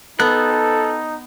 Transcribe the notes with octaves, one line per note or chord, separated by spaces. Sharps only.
B3 D#4 A4 F#6